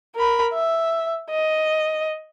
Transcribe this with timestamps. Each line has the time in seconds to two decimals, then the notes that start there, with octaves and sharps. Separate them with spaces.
0.16 A#4 B5
0.54 E5
1.30 D#5